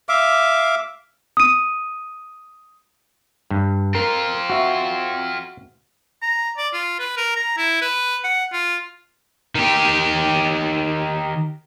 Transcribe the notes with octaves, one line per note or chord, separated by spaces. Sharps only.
E5 F5 D6
D#6 D#7
G2
C4 F4 A#4
F#4 E5
A#5
D5
F4
B4
A#4
A#5
E4
B4
F#5
F4
D#3 G4